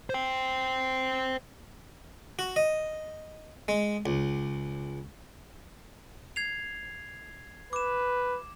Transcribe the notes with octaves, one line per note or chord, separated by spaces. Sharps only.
C5 G5
F#4
D#5
G#3
C#2
G#6 C7 F7
B4 D6 E7